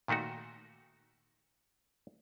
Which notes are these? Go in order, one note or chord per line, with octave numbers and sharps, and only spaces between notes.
A#2 D#3 A3 D#4 F#4